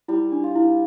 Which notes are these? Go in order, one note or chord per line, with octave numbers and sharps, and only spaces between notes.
G3 E4
D4
F4
E4